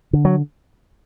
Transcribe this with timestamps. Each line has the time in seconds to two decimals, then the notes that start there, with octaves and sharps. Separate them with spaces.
0.13 D3
0.25 F#3